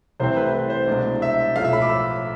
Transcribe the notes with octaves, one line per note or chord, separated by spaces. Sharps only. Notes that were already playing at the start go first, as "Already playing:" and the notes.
C2 C3 E3 A3 C4 C5
B4
B4
C5
C2 B2 G#3 D4
E5
B1 A2 F3 F5
E5
B5
D6
E6